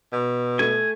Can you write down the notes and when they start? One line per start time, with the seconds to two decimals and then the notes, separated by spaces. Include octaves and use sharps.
0.12 B2
0.59 A3 G#5